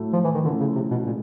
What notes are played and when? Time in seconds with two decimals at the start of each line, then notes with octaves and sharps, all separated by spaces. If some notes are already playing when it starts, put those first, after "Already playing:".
Already playing: A2 F#3 A3
0.13 F3
0.24 E3
0.35 D#3
0.44 D3 F3 A3 C#4 E4
0.60 C#3
0.75 C3
0.91 B2
1.06 A#2 G#3